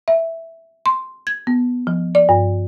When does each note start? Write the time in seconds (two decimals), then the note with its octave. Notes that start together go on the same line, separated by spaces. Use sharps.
0.08 E5
0.86 C6
1.27 G#6
1.47 B3
1.87 F3
2.15 D5
2.29 G2